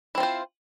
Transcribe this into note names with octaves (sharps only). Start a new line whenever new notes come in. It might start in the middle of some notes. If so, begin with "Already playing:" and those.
C4 E4 F4 C5